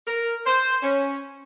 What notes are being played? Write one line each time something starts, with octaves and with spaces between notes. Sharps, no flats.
A#4
C5
C#4